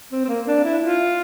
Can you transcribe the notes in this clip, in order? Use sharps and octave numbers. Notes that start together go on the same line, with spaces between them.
C4
C4
A#3
D4
E4
F4